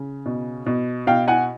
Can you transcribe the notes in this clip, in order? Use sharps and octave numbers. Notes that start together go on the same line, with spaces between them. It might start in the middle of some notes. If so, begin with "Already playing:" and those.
Already playing: C#3
B2
B2
B2 F5 G5
F#5 G#5